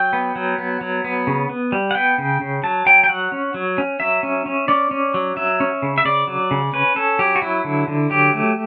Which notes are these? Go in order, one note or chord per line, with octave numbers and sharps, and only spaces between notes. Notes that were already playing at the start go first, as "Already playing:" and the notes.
Already playing: F#3 G5
B3
F#3
B3
F#3
B3
C#3
B3
G3
F#5
B3 G5
C#3
C#3
F#3 A5
F#3 G5
G5
F#3 F#5
C#4
F#3
C#4
F#3 E5
C#4
C#4
C#4 D5
C#4
F#3
F#3 E5
C#4
C#3
E5
C#3 D5
F#3
C#3
C#4 B4
C#4 A4
F#3 G4
F#4
F#3 E4
D3
D3
F#3 G4
A3